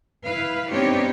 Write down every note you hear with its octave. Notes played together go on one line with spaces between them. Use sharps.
E4 B4 F5
B3 C4 D4 D#4 G4 C#5